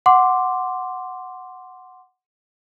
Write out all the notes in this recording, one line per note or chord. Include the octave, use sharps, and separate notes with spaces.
F#5 C6 D6